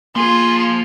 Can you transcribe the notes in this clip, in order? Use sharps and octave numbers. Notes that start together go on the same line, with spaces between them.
F3 A#3 F4 G#4